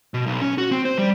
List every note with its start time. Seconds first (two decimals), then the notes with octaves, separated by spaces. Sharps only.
0.14 B2
0.27 B1
0.41 C#4
0.58 F#4
0.72 C4
0.85 C5
0.98 G3